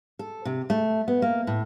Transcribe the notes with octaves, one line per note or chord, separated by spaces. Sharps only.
A4
C3
A3
B3
A#3
A2